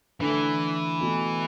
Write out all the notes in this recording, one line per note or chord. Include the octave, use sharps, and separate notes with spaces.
D3 E3 A3 D4 A4
B2 A3 E4